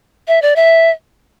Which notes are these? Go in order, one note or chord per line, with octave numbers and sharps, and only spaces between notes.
E5
D5
E5